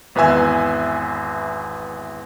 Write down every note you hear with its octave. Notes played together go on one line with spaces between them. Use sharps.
G#1 E2 B4 E5 G#5 E6